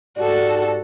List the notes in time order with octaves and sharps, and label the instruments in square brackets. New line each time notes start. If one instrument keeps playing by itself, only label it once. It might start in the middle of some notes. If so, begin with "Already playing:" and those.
[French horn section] G#2 G4 D5 [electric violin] F#4 A4